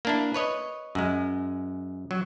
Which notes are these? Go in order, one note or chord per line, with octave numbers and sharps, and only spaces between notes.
A#3 D4 E4
B4 C#5 D#5
F#2 G#3
F#3